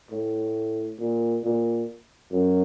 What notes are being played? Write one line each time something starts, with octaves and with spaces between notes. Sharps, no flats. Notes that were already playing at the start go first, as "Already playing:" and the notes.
A2
A#2
A#2
F#2